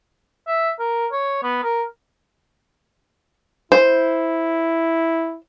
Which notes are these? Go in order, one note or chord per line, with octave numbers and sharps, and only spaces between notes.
E5
A#4
C#5
B3
A#4
E4 C5